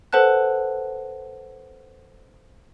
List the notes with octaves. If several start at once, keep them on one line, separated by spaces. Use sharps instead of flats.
A4 B4 C5 F#5 A5 F#6